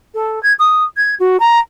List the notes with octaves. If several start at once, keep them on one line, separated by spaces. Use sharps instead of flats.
A4
G#6
D#6
G#6
F#4
A#5